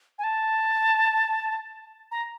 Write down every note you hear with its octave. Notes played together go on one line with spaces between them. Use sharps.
G#5
A5
A#5